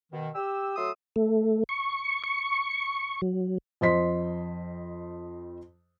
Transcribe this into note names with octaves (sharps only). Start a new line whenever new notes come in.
B2 D#3
G4 E6
F#3 A3 F#4 C6 D#6 E6
A3
C#6
C#6
F#3
F2 C5 D#5 C6 B6